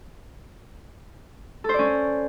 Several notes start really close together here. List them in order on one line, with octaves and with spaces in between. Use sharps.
A4 C5 D5 C#4